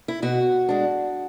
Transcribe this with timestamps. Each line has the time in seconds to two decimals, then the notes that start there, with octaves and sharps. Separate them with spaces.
0.08 E4
0.22 B2 F#4
0.69 G#3 D4